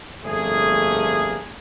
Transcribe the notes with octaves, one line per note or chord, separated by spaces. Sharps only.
G1 F2 A3 A#3 G#4